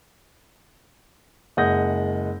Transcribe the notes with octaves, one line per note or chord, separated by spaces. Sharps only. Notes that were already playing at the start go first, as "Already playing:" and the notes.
F#1 G#3 F#5 D#6 G6 A#6